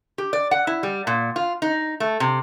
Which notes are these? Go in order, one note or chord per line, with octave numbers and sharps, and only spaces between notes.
G4
D5
F#5
E4
G3
A#2
F4
D#4
A3
C3